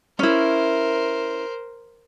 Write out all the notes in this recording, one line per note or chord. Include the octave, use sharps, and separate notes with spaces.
C#4 E4 A#4 C5